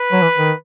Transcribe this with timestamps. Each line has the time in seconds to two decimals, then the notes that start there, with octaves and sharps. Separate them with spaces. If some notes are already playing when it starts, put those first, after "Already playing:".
Already playing: B4
0.12 F#3
0.22 E3
0.38 D#3